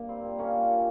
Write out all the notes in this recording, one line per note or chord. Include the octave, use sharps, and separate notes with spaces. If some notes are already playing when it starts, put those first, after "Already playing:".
Already playing: G2 A#3
G3 C4
A#2
A#2 A#3 C#4
A#2
G3